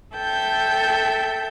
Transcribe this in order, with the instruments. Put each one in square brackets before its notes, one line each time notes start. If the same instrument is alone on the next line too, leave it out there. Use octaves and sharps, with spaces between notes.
[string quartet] A4 E5 G5 G6